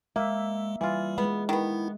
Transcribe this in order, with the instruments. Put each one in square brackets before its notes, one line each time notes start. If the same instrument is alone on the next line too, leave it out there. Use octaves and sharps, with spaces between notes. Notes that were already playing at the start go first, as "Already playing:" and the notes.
[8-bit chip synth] G#3 [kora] A#3 [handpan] E5
[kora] E3 F4 [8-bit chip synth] G3
[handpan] G#3 [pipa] B3
[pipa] D#3 B3 [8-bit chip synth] E4